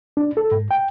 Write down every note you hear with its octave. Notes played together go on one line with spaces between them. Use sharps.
D4
A4
G#2
G5